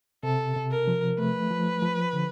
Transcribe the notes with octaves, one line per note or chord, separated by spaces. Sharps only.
C3 A4
C3
A#4
F3
A3 B4
F3
F3
D3